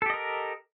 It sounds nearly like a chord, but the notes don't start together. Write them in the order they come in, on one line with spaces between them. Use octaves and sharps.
A4 G4 D#5 A#4